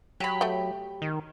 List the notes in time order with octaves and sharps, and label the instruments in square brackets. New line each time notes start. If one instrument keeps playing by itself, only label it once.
[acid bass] F#3 [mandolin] G4 B5
[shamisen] A3 G5
[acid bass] D#3